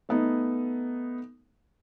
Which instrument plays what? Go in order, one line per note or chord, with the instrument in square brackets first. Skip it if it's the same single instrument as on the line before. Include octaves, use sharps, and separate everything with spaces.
[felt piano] A3 B3 D#4